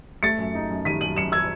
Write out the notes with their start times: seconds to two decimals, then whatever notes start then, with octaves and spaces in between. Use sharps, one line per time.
0.23 A3 A6 C#7
0.39 F#2
0.55 D#4
0.70 F#2
0.85 D#3 B6 D#7
1.01 F#2 D#7 F#7
1.16 F#2 C#7 E7
1.32 E6 G#6